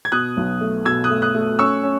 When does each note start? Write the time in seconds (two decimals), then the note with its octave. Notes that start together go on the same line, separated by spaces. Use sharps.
0.05 G#6
0.12 B2 D#6 F#6
0.37 B1
0.61 A3
0.85 B2 E6 G#6
1.04 D#6 F#6
1.10 A3
1.22 D#6 F#6
1.35 A3
1.59 C#4 C#6 E6
1.83 C#4